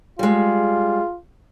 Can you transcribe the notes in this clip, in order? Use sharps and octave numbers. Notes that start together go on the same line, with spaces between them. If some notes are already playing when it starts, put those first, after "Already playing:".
G3 G#3 F4